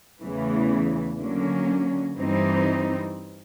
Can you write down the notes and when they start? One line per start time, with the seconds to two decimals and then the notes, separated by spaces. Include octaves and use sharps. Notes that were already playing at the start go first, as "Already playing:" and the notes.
0.21 E2 C#3 E3 A3
1.19 D3 F#3 A#3 C#4
2.17 G2 E3 G3 C4 D#4